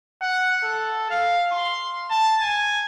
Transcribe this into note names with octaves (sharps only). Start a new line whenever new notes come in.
F#5
A4
F5
C6
A5
G#5